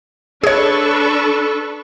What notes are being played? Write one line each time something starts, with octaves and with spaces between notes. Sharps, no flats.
D4 G#4 A4 B4 C#5 C#6